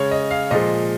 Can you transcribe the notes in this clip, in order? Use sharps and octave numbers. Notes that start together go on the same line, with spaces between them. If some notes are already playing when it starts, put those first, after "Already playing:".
Already playing: C#3 G#3 C#5
D#5
F5
A#2 F3 G#3 D#5